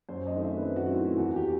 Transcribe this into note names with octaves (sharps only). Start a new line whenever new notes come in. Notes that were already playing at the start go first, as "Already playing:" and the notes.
F#2 C5
D#5
D#3 A3 C4
E5
B4
F#2 C5
F#4
D#3 A3 C4 E4
E4
E2 F#4
G4